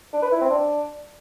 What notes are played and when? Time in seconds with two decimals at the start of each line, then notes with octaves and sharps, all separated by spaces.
0.13 D4
0.22 B4
0.32 E4
0.41 C4
0.50 D4